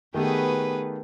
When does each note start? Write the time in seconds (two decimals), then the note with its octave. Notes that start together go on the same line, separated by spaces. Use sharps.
0.14 D#3 A3 B3 G4 G#4 B4